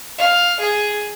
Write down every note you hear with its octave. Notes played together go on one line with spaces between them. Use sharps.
F5
G#4